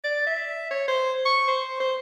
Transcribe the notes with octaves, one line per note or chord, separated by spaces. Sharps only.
D5
E5
C#5
C5
C#6
C5
C5